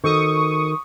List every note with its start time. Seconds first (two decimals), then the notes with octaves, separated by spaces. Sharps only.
0.04 D#3 F#4 A4 C5 C#6 D#6